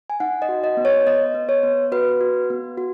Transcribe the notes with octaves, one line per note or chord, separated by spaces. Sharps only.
G#5
D#4 F#5
D#5
F#4
D#5
B3
C#5
B3 D#5
B3
C#5
B3
F#4 B4
F#4
B3
F#4